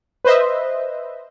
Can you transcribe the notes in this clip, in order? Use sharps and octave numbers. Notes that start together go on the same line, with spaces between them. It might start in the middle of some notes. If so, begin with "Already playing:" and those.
B4 C5 D#5 E5